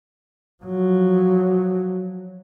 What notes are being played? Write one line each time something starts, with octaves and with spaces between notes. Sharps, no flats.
F3 F#3